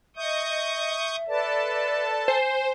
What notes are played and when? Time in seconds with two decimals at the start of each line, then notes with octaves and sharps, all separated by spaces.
0.17 D#5 E5 C#6 D#6 G6
1.28 A4 B4 D5 A5
2.28 C5 G#5